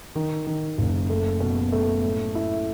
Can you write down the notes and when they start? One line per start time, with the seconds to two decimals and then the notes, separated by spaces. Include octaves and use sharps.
0.15 D#3
0.47 D#3
0.78 F#1
1.10 A3
1.40 B2
1.72 A3
2.04 A2
2.35 E4